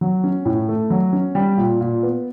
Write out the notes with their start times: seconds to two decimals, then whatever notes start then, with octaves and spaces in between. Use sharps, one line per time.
0.01 F#3
0.24 C#4
0.45 A2
0.69 A3
0.90 F#3
1.13 C#4
1.35 G3
1.57 A#2
1.81 A#2
2.03 B3